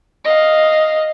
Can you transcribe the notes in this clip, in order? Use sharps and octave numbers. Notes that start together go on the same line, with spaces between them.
D#5 F5